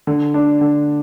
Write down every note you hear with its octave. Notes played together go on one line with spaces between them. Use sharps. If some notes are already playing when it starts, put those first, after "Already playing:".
D3
D4
D3